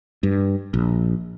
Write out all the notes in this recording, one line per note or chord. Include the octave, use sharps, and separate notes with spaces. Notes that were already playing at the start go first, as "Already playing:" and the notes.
G2
A#1